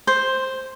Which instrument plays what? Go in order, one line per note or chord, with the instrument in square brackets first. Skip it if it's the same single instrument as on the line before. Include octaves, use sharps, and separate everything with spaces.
[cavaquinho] C5